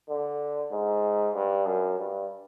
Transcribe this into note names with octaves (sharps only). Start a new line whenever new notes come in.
D3
G#2
G2
F#2
G2